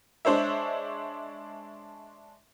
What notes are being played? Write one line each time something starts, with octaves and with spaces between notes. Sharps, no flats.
G#3 D4 C5 C#5 E5